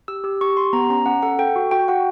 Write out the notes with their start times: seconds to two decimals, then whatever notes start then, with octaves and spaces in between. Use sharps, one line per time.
0.08 G4 E6
0.24 G4 E6
0.41 G4 C#6
0.57 G4 C6
0.73 B3 A#5
0.90 C#4 A#5
1.06 C#4 F#5
1.22 A4 F#5
1.39 A4 G5
1.56 F#4
1.71 F#4 G5
1.88 F#4 F#5